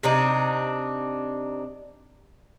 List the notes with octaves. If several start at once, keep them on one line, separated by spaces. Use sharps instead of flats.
C3 C4 D4 D#4